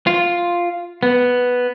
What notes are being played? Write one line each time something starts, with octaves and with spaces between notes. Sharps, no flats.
F4
B3